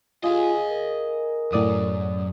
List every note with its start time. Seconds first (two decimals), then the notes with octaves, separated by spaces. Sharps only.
0.24 F4 G#4 D#5 F5
0.71 A#4
1.53 F#2 A2 D5 D#6